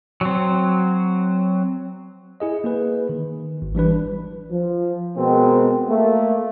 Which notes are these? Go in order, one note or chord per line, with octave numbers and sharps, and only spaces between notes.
F#3 C4
E4 G#4 D#5
A#3 G#4 B4
D#3
G#1
E3 G3 D4 B4
F3
B2 G#3 B3 C4 A#4
A3 A#3